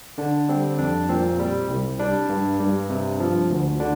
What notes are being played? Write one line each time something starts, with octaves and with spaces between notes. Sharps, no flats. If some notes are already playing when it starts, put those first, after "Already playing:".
D3 D4
G3 C4
F2 D4
A#2 C4
G3
C2
G3 D4
G2
G2
C3
F3
D2
D3 D4